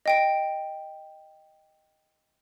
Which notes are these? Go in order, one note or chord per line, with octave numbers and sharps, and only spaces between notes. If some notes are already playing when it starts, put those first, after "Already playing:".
D#5 G5 D7